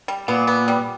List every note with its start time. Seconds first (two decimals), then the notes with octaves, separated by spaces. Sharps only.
0.08 G3
0.28 A#2 B3
0.47 B3
0.68 G3